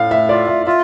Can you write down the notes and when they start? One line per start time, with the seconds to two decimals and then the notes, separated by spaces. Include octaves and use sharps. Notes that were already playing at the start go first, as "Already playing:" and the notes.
Already playing: A2 F5
0.11 E5
0.29 F4 D5
0.48 E5
0.67 F4 E5